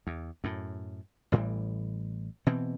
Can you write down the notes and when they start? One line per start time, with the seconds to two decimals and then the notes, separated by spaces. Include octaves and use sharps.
0.07 E2
0.44 F#2 A2
1.32 A1 A2 E3 G3
2.46 B2 E3 C4